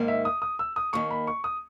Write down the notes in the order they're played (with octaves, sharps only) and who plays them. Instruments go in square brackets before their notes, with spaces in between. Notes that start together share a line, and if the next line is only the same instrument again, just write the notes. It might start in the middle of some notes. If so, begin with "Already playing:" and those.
Already playing: [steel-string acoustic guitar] G#2 D#3 A#3
[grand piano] E5
D#6
D#6
E6
D#6
[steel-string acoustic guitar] D#2 D#3 A#3 [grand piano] C#6
[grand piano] B5
C#6
D#6